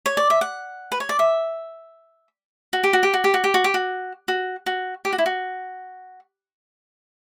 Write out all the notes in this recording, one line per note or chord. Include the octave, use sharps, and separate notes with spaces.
C#5
D5
E5
F#5
B4
C#5
D5
E5
F#4
G4
F#4
G4
F#4
G4
F#4
G4
F#4
G4
F#4
F#4
F#4
G4
F#4
E4
F#4